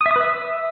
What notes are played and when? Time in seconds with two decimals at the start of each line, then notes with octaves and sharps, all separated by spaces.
0.01 D#6
0.06 E5
0.11 D#6
0.16 B4
0.21 E5